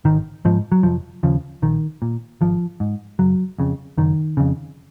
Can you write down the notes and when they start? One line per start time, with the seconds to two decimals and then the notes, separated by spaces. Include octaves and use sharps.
0.05 G#1 D#3
0.45 G#2 F3
0.72 F#3
0.83 F1 F3
1.23 D#2 C#3 F3
1.62 A#1 D#3
2.02 A#2
2.41 G#1 F3
2.80 G#2
3.19 F#1 F#3
3.59 F2 C#3
3.98 F#1 D#3
4.37 F2 C#3